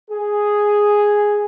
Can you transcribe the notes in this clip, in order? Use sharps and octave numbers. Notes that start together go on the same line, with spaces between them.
G#4